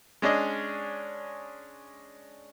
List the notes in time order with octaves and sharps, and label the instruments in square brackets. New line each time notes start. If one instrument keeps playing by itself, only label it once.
[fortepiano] G#3 C#4 D4 D5 D#5